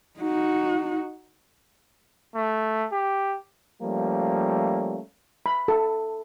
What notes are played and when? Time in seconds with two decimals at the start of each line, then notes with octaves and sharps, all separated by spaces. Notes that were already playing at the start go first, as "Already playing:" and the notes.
0.20 D#4 F#4
2.35 A3
2.92 G4
3.82 F3 G3 A3 A#3 C#4
5.46 B5
5.68 A4